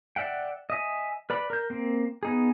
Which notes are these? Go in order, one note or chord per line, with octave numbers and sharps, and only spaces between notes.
D5 E5 F#5 G5
D#5 E5 G#5
B4 D5 B5
A#4 G6
A#3 C4
B3 D#4 G#4